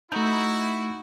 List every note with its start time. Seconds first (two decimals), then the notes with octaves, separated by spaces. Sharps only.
0.12 A3 D#4 E4 F#4 G6